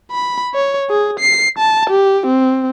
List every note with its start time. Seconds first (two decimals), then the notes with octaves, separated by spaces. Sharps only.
0.12 B5
0.54 C#5
0.90 G#4
1.20 C7
1.58 A5
1.90 G4
2.26 C4